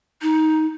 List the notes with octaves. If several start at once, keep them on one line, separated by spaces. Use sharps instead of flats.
D#4